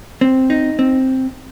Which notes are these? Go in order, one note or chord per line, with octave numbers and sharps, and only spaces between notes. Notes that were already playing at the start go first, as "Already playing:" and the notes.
C4
D#4
C4